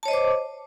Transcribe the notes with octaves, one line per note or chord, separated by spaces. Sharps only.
C5 C#5 D#5 A5 D6